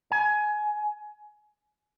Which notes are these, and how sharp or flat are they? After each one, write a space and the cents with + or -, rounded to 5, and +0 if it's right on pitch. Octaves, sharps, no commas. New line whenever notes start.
G#5 +20